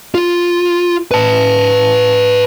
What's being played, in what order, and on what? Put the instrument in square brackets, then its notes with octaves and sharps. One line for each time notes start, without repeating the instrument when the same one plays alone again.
[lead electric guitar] F4
B4 A5